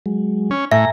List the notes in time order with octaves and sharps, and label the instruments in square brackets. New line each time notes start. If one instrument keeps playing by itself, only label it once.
[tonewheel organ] F#3 G#3
[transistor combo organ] C#4
[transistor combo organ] A2 [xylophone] E5 [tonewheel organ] G#5 A#5 A#6